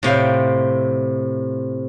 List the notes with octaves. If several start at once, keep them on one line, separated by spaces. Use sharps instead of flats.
A2 C3 F5 G5